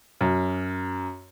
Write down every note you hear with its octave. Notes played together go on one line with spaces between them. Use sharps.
F#2